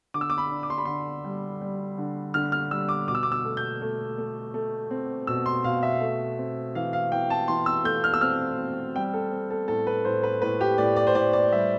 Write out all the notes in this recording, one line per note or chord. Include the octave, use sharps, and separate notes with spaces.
D3 D6
E6
D6
B5
D4
D6
C6
B5
D3 C6
G3
G3
D3
D3 F6
F6
G3 E6
D6
B2 D6
E6
D6
E6
A3
G6
A3
A3
A3
C4
B2 E6
C6
B2 F5
E5
A3
C4
E3 F5
F5
E3 G5
A5
E3 C6
E6
A3 G6
F6
E6
C4 F6
C4
G3 G5
A4
C4
A4
A2 A4
B4
A2 C5
B4
A2 B4
G4
A2 D5
D5
C5
A2 D5
D5
G3 E5